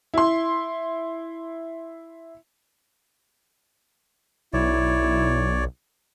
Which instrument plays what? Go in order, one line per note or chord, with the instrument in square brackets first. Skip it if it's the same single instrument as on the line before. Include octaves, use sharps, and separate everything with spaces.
[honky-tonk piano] E4 C6
[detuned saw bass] B1 [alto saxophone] E4 [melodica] C#5 D5